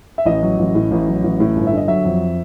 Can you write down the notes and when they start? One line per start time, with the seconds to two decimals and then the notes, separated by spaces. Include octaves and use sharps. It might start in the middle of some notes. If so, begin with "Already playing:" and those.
0.18 E5
0.25 A1 D#5
0.43 F#3
0.59 A1
0.75 A2
0.91 A1
1.08 F#3
1.23 A1
1.40 A2
1.56 G1
1.67 E5
1.73 D3 D#5
1.88 F#3 E5
2.05 F2